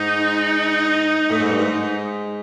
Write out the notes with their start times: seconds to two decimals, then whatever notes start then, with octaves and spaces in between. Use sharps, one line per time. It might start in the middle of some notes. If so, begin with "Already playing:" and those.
Already playing: G#2 D#4
1.30 A2
1.40 G#2
1.50 G2
1.59 G#2